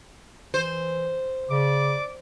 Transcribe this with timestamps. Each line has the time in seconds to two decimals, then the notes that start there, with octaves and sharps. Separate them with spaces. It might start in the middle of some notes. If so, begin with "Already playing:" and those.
0.54 E3 C5
1.49 C#3 D5 D6